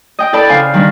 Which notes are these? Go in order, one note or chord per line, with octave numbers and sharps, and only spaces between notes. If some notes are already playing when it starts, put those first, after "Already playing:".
D#5 G5
E4 A4 B4 D5 A5
C#3 D4 C5 F5 G#5
D#3 G3 D4